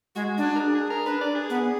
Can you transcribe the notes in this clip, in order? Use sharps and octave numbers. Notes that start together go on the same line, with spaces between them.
G#3 F#4
D4
A#4
G#4
G#4
A#4
D4 B4
D5
G#4
B3